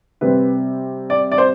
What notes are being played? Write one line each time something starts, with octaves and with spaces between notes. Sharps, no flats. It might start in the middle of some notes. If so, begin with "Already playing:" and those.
C3 G3 C4 B4
D5
D5
C5